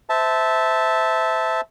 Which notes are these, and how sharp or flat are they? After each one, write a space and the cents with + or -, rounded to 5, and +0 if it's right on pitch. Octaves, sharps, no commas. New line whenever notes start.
C5 -25 E5 -15 A5 +0